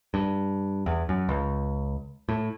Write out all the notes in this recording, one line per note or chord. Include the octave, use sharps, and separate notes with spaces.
G2
E2
F#2
C#2
A2